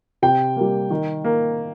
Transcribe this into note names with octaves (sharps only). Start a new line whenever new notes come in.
C3 G5
G3 A#3
D#3
A#3